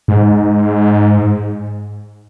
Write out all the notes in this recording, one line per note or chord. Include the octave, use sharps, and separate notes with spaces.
G#2